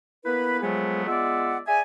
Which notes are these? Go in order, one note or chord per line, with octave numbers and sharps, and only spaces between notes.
A#3 B3 E4 B4
F3 F#3 G#3 A3 B3 G#4
G#3 B3 F4 D5 E5 F#5
G#4 D5 E5 G#5